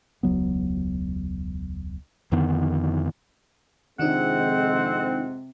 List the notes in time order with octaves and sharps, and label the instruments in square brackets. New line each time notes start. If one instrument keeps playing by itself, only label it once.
[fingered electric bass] E1 C#2 F#3 B3
F2 D3 D#3 B3
[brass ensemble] F2 G#3 C4 [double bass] C3 [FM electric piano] D#3 D4 D#4 [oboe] F#5